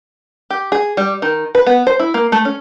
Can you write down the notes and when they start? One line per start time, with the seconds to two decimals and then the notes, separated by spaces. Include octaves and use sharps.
0.50 G4
0.72 G#4
0.97 G3
1.22 D#3
1.55 B4
1.67 B3
1.87 C5
1.99 E4
2.14 A#3
2.32 A3
2.45 C#4